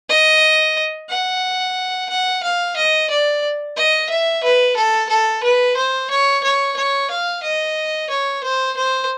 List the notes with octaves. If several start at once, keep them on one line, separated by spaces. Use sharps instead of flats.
D#5
F#5
F#5
F5
D#5
D5
D#5
E5
B4
A4
A4
B4
C5
C#5
C#5
C#5
F5
D#5
C#5
C5
C5